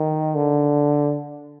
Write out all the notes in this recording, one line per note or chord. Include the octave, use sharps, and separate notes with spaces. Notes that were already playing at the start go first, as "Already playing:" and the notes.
Already playing: D#3
D3